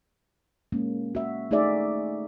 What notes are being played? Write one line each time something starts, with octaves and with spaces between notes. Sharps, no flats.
G#3 A#3 C#4
F#4 E5
A3 D#4 F#4 G#4 D5 E5